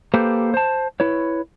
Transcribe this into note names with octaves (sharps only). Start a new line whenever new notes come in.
A#3 G4 A4 B4 C5
C5 A5
E4 B4 C#5